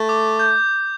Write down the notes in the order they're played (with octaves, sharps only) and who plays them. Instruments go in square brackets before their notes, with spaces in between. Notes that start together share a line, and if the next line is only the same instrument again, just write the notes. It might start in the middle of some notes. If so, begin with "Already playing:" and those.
Already playing: [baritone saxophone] A3
[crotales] D6
G6